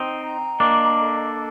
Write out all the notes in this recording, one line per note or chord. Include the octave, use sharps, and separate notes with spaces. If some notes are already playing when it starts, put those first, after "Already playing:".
Already playing: C4 D#4 G5
A#5
A#3 D4 D#5
A4